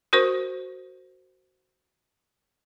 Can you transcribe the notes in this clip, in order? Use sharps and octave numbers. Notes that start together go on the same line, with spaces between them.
F#4 A#4 C5 C#6